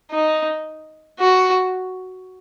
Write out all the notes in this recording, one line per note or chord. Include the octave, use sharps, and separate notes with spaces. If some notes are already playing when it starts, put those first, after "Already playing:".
D#4
F#4